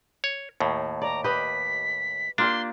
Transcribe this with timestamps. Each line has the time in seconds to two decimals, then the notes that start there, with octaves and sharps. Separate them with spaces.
0.24 C#5
0.60 D#2 A2
1.02 D5 A#5
1.24 G4 B4 D#5 B6
2.38 A#3 D4 F4 G4 C6